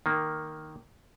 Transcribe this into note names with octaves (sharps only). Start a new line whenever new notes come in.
D#3 A#3